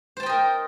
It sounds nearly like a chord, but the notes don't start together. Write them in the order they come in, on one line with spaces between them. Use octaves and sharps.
C5 A5 G5 D#5 A#4